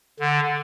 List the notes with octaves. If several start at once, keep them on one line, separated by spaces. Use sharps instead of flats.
D3